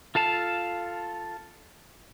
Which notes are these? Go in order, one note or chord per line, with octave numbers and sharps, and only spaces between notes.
F4 A4 F5 A5